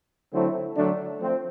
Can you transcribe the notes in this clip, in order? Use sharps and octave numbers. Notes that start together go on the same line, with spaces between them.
D3 F#3 A3 C4 E4
D3 F#3 A3 D4
F3 A3 C4